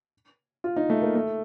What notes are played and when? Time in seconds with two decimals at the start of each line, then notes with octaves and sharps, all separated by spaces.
0.64 F4
0.76 D#4
0.90 A3
1.02 A#3
1.15 A3